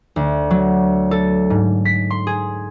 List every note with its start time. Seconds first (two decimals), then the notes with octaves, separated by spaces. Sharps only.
0.16 D2
0.51 F#3
1.11 A4
1.50 G#2
1.85 B6
2.11 C6
2.27 G#4